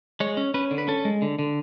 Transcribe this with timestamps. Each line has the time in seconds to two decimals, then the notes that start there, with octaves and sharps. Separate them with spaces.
0.20 G#3 C#5
0.37 C#4
0.54 C#4 B4
0.71 D3
0.78 B4
0.88 C#4 A4
1.05 G#3
1.22 D3
1.39 D3